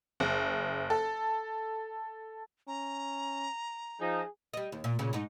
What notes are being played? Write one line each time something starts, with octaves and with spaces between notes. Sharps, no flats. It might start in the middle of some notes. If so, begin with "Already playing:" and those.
F#1
A4
C#4 A#5
F3 D#4 G#4
G3 D#5
D#2
A#2
A#2 C#3
G#2 D#4